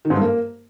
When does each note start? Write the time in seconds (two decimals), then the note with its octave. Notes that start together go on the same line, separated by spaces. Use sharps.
0.05 D#3
0.10 G#2
0.16 G2
0.21 A#3